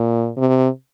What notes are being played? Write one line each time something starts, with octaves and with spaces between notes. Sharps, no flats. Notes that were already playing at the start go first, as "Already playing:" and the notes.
Already playing: A#2
C3